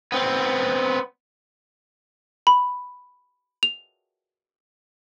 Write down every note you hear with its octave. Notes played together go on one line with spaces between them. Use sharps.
B3 C4
B5
F7